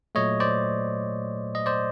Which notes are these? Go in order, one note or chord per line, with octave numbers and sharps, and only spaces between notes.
A#2 F#3 A3 C#5 D#5
C5 D5
D#5
C5 D5